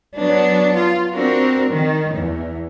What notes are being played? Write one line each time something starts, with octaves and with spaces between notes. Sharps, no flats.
F#3 B3 D4
F4
C4 D4 F#4 A#4
D#3
E2